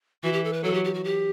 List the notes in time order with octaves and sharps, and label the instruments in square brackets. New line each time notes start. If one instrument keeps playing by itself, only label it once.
[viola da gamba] E3 [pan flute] F#4
[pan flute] G4
A4
B4
[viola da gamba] F#3 [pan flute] A4
[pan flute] G4
G4
F#4
G4